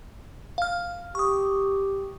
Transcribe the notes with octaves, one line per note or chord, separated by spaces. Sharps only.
F5 F6
G4 C#6 D#6